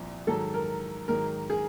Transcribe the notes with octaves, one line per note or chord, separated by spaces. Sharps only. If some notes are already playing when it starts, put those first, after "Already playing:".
Already playing: C2 A#2 F3
G#2 D#3 F#3 A4
A#4
G#2 D#3 F#3 A#4
G#4